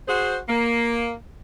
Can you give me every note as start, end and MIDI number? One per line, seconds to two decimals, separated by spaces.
0.07 0.35 66
0.07 0.35 68
0.07 0.35 72
0.47 1.11 58